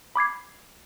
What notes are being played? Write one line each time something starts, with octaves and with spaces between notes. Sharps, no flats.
B5 D6 G#6 C7